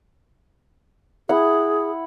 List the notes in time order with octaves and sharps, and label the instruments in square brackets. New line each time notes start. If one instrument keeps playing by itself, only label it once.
[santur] E4 F#5 [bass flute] G#4